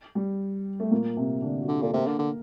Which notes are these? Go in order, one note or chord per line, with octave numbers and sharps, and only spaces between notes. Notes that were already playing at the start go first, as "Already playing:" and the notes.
G3
A3
A#2 A#3
C3 C4
D3 D4
F#4
D3 G4
A#2 A4
C3 A#3 A#4
D3
D3